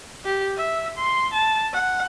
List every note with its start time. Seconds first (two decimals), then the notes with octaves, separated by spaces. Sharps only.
0.25 G4
0.57 E5
0.97 C6
1.33 A5
1.73 F#5